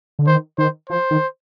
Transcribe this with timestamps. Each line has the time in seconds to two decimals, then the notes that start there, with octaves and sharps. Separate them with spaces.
0.19 D3
0.27 D#3 C5
0.58 D#3 C5
0.90 F3 C5
1.11 D#3